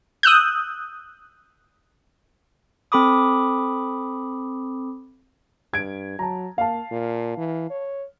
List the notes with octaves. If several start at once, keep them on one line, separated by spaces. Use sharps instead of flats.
D#6 E6 F#6 G6
C4 A4 B5 D6 D#6
G2 G#6 D7
F#3 A5 A#5
A#3 F5 A5
A#2
E3
C#5